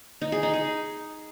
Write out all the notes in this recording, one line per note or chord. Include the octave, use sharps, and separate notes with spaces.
D#4
G#4
D#4
G#4